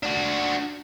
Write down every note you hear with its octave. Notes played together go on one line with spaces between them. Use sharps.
D4 F#4